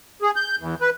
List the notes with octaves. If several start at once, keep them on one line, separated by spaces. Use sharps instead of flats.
G#4
G6
E2
B4